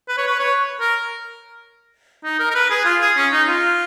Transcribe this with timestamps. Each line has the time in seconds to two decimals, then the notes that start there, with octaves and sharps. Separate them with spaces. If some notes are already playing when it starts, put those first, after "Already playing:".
0.09 B4
0.18 C#5
0.27 B4
0.39 C#5
0.81 A#4
2.24 D#4
2.39 A#4
2.51 A#4
2.55 B4
2.70 G#4
2.85 F4
3.01 G#4
3.17 C#4
3.32 D#4
3.48 F4